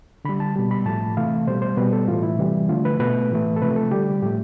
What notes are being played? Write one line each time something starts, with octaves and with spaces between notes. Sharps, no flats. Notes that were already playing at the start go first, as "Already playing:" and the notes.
D3 G3 B5
A5
B2 G3
B5
A2 F3 A3 A5
C3 E3 A3 F5
B2 G3 C5
C5
B2 G3 B4
A4
A2 E3 A3 F4
E4
C3 E3 G3
D3 F3 A3 F4
B4
B2 A3 B4
A2 E3 A3
A4
C3 F3 A3 B4
A4
D3 G3 G4
A2 F3 A3 G4